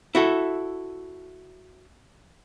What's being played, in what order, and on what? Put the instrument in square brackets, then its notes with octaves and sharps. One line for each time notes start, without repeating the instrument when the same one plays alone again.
[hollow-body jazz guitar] E4 F#4 A4